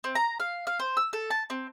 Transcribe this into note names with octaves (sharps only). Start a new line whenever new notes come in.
C4
A#5
F5
F5
C5
E6
A4
A5
C4